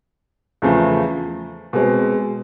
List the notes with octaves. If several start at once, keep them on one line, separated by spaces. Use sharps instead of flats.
E2 C#3 F3 A3
B2 G#3 C4